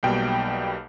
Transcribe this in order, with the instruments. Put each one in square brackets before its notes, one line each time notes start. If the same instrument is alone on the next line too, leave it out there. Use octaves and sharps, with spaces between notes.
[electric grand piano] B1 B2 G3 A#3 G5